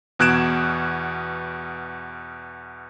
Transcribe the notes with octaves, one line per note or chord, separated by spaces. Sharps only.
E2 B2 F#6 G#6 D7 E7